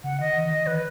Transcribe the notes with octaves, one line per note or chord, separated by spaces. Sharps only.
C#3 F#5
D#3 D#5
E3
D#3
E3 B4